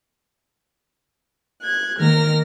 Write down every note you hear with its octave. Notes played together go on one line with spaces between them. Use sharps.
F#6 G#6
D#3 A#3 A#4 F6 A#6